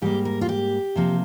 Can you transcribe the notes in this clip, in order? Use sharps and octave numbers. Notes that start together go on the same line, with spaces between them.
G#2 G3 A#3 G4
A#4
F4
G4
C3 F3 A#3